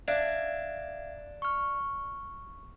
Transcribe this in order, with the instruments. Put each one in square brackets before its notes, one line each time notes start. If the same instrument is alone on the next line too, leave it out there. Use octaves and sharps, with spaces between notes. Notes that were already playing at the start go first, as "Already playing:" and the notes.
[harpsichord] D4 [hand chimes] E5 F5 G#6
[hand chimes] C#6 F6